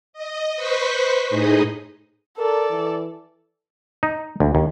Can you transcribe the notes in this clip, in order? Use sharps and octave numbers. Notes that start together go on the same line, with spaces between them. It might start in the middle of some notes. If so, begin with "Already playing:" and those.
D#5
B4 C5 C#6 B6
A2 D#4 G#4 D#5 D#6
A4 A#4 D5
E3
D#4
D2
D#2